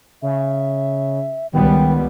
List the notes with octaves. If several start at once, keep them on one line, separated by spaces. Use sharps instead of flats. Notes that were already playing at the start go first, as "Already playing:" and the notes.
C#3 E5
C#2 D#3 G3 B3 G5